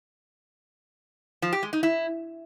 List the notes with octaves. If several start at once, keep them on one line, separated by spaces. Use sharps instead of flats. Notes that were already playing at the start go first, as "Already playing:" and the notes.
F3
G4
G#3
D#4
E4